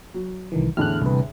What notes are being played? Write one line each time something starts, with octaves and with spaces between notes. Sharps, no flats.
F#3
C2 D#3 E3
E2 A2 D3 F6 F#6
C2 B4